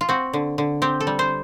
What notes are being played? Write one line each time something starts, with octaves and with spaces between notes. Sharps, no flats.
F4
C4 F#4
D3
D3
C4 G4
A4
G3
C5